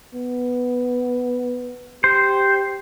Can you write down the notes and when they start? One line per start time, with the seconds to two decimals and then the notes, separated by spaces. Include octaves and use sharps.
0.15 B3
2.04 G4 C5